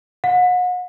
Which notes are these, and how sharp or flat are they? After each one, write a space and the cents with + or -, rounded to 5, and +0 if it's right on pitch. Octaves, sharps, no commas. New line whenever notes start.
F#5 -35